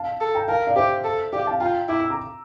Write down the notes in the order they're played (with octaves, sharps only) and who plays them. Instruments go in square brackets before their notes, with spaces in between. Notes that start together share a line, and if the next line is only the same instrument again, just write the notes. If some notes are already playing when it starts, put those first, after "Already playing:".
Already playing: [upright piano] F5 A5
[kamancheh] A4
[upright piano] G5 A#5
[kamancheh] A#4 [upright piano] F5 A5
[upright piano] D5 F5
[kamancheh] G4 [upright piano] C5 E5
[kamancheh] A4
[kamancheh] G4 [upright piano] D5 F5
[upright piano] F5 A5
[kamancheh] F4 [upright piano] G5 A#5
[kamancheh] E4 [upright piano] D6
[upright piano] E6
A#5 D6